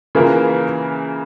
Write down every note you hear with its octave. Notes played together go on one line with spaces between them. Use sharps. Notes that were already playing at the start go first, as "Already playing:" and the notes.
C#3 E3 A#3 F4 A#4